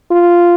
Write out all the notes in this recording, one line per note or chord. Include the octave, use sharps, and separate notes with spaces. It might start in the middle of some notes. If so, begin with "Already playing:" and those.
F4